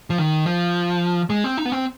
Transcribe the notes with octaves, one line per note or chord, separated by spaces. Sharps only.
F3
D#3
F3
G#3
C4
D#4
B3
C4